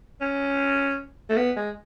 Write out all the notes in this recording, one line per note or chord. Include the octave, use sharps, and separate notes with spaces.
C#4
A3
B3
G#3